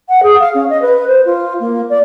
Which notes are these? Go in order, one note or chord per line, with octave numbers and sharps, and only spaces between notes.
F#5
G#4
F5
C#4
D#5
B4
C5
F4
A#3
D5